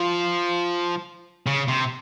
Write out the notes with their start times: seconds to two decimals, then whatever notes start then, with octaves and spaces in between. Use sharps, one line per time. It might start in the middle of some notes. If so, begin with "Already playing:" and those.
Already playing: F3
1.46 C#3
1.68 C3